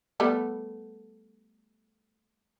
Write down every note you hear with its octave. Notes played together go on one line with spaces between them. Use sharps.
G3 A3 B3